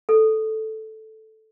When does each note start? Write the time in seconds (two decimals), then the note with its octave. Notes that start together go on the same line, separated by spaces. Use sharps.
0.09 A4